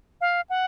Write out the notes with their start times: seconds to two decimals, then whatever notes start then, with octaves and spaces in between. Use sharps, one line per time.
0.21 F5
0.50 F#5